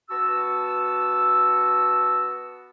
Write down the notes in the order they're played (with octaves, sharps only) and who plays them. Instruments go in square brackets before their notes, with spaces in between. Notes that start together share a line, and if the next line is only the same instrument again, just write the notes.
[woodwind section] B3 F#4 A5 E6